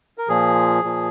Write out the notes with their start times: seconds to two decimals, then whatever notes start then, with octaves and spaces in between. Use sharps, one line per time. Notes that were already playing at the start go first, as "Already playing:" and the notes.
0.18 A#4
0.29 A#2 F3 G#4
0.83 A#2 F3